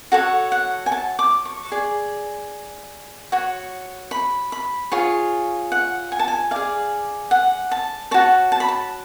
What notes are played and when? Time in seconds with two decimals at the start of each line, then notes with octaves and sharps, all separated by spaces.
0.12 F#4 A4 C#5 F#5
0.52 F#5
0.86 G#5
0.92 A5
1.19 D6
1.45 C#6
1.72 G#4 D5
3.32 F#4 C#5
4.11 B5
4.52 B5
4.92 F4 G#4 C#5
5.72 F#5
6.12 G#5
6.19 A5
6.28 G#5
6.51 G#4 D5 F5
7.31 F#5
7.71 A5
8.11 F#4 C#5 A5
8.52 A5
8.60 B5
8.69 A5